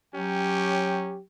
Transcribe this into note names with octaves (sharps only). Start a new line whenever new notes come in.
F#3 C#4 G4 G5